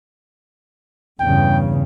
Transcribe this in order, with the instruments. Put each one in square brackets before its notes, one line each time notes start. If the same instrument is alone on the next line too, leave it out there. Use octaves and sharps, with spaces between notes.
[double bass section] E2 G2 C#3 [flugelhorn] G5